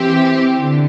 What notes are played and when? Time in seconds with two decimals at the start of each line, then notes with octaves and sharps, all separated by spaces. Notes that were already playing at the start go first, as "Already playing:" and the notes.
Already playing: E3 C4 G4
0.58 D3